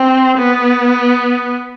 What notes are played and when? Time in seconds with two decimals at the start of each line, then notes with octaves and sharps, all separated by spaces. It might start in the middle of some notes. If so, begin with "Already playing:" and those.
Already playing: C4
0.38 B3